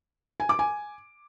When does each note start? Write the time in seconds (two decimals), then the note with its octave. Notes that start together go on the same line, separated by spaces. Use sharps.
0.40 G#5
0.49 D6
0.59 G#5